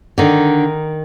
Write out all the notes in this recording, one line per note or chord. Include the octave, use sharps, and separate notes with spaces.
D3 D#3 D#4